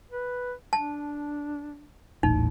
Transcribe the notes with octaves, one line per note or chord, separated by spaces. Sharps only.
B4
D4 A5
D#1 A1 A2 D#4